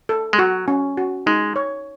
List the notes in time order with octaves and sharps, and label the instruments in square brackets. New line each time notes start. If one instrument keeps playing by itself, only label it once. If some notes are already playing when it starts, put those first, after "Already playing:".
[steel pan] A4
[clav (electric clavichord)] G#3
[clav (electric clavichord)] F#3 [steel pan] F#4
[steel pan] C#4
F#4
[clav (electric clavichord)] G#3 [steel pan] D#4
[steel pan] C#5